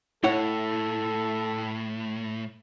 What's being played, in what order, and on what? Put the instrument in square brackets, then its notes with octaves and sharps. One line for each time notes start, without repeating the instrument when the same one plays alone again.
[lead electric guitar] A2 [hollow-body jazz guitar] E4 C#5 F#5 [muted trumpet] A4